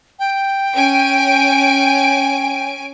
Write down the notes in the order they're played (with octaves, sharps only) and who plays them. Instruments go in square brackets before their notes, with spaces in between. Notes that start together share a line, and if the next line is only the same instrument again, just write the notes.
[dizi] G5
[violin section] C#4 G#5 D7